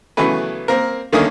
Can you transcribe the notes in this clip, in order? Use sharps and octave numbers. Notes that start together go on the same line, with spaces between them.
C#3 E3 F#3 A3 B3 B4
A#3 C4 A#4
D3 D#3 A3 A#3 C#4 D#6